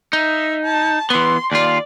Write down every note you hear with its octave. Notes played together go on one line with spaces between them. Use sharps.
D#4 E5
A5
E3 B3 C6
D#2 F4 D5